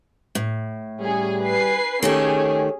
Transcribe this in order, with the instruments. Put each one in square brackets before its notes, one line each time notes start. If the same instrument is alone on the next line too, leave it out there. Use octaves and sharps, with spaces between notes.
[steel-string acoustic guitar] A2
[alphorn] G3 [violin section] C#4 G#4
[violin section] B4 G#5 C7
[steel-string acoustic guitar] D#3 A3 G4 [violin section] C#4 G#4 [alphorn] C#5